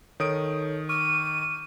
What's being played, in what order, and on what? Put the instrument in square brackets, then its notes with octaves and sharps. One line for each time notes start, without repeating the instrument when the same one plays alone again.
[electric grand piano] D#3 D#6 D7 [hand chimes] D#4 A4 C#5
[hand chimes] C#6 D6 F6 [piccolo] D#7